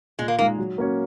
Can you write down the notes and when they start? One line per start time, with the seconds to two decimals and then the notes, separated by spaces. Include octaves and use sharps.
0.19 A#2 G#3
0.28 A#3
0.38 G#3 A#3 D#4
0.58 F#3
0.78 A#3 C#4 F#4 C#5